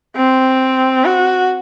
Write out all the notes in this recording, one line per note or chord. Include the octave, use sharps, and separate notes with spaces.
C4
F#4